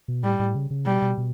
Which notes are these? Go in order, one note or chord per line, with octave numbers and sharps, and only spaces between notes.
B2
A2 G3
A2
C#3
C#3
B2 G3
B2
B2